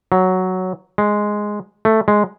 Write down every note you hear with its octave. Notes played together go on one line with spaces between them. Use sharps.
F#3
G#3
A3
G#3